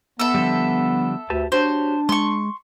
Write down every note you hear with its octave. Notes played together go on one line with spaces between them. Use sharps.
B3 A4 E5
D3 F3 G3
D2 G4 B4 A5
D4 F#4 G4 C5 C#5
G#3 C6 C#6